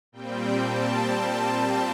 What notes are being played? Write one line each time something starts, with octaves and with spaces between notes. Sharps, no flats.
A#2 G3 C4 G5
A5